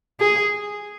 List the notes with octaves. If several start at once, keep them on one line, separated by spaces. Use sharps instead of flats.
G#4